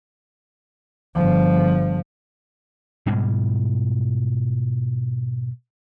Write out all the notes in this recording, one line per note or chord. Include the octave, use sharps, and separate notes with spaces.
G1 F3
G#2 B2 G3 G#3